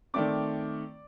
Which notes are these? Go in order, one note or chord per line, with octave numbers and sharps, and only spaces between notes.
D#3 A3 C4 D5 D6